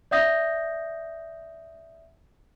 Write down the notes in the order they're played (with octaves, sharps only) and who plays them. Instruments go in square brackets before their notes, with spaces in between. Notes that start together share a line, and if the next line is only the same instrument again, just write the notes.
[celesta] D5 E5 F#5 D#6 G6 A#6